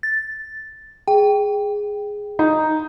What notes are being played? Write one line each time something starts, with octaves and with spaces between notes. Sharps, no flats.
A6
G#4 G5
D#4